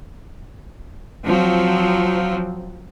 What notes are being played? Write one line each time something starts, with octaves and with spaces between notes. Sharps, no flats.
F3 F#3 C4